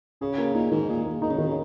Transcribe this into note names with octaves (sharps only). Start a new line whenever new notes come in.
C#3 G#4
A#3
A#2 D#4
G#2 D#3
A#2 G#4
A#3
D#3 D#4
C#3
B2 D#3
C#3